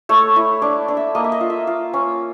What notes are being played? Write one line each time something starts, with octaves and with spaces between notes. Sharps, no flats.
A3 C#5
E4
D4 D5
D4
E5
A#3 D#5
E5
D#5
F4
E5
F4 F5
C#4